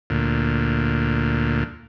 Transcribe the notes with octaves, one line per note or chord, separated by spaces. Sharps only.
D2 A#2